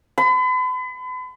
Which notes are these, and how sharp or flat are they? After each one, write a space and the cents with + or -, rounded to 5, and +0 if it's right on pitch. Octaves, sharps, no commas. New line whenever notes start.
B5 +40